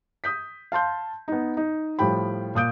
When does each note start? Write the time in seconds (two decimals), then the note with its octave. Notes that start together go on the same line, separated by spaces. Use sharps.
0.24 D#6 G6 B6
0.72 F5 A5 C6 G6
1.28 B3 D#4
1.57 D#4
1.99 A2 F3 G3 G5 B5
2.55 A#2 D#6 G6 D7